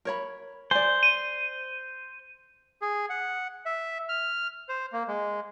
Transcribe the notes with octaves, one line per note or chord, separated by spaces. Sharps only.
A#4 C#5 B5
C5 D5 G#5
D#7
G#4
F#5
E5
F6
C5
A#3
G#3